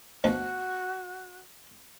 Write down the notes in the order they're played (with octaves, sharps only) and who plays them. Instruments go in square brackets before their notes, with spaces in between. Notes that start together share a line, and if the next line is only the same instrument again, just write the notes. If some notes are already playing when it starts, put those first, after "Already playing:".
[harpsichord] D2 B2 F3 [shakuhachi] F#4